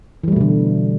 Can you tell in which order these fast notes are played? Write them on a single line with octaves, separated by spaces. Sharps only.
E3 G3 A3 B2 D3